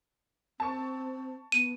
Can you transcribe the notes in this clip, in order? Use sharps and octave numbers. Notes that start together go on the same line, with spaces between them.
C4 A5 C#6
B3 D#7